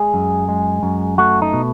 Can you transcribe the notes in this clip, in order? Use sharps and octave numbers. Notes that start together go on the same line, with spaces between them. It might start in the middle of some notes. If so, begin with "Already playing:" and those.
Already playing: G#3 G#4
F#2
G#3
F#2
A3 F#4
D#4
B2